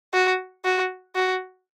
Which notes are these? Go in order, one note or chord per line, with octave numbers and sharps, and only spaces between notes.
F#4
F#4
F#4